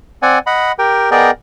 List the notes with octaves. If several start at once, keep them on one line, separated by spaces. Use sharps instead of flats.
C4 D5 F#5 G#5
D#5 F#5 B5
G4 A#4 G5
B3 G#4 A#4 D5 D#5 G5